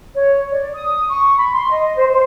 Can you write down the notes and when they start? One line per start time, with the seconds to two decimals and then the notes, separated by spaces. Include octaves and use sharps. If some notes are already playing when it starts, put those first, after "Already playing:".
0.15 C#5
0.51 D5
0.75 D#6
1.08 C#6
1.37 B5
1.53 C6
1.71 D#5
1.96 C5
2.11 C5